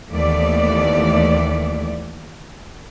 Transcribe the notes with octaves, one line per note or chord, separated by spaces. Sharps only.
D#2 E3 A3 B3 D5